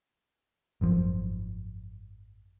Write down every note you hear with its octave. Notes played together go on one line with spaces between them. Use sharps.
G#1 F#2 F3